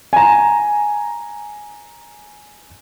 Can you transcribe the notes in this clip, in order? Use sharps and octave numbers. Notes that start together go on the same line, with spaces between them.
G#5 A#5